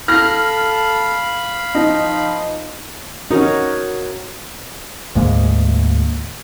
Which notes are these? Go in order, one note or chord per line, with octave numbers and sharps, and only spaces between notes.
A4 F5 B5 F6 A#6
F3 D#4
C#4 D#4 F#4 A#4 C#5
D2 G#2 G#3 A#3